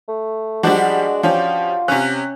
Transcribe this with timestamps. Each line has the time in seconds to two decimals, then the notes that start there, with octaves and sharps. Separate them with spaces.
0.08 A3
0.63 F3 G3 G#3 D4 F#4
1.23 F3 C#4 F4 G4
1.88 C3 C#4 F#6